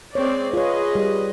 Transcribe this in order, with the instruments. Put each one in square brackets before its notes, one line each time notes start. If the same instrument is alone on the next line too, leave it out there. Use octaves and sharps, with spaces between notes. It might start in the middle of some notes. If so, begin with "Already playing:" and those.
[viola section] G#3 C4 D5 [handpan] C#5
[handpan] F4 C#5 [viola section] G#4 B4 D#5
[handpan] G3